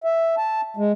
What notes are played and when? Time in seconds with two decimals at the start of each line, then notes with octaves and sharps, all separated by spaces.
0.04 E5
0.38 A5
0.77 G#3